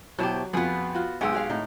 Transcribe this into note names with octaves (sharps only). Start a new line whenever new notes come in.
B2 F#3 E4 G4 C5 A5
F2 B3 F4 F#4 G#4 B4
F4 F#4
B1 G#3 G4 G#4 F#5 G#5 E6
F#4 G#4 F5
A2 D#4